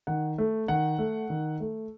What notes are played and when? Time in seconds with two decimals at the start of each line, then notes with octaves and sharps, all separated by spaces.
0.07 D#3 F#5
0.38 A3
0.68 D#3 F#5
0.99 A3
1.30 D#3
1.60 A3